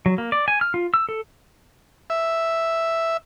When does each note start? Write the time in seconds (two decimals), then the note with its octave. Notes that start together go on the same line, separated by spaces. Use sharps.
0.06 F#3
0.18 A#3
0.32 D5
0.48 G#5
0.61 F6
0.74 F4
0.94 E6
1.09 A4
2.10 E5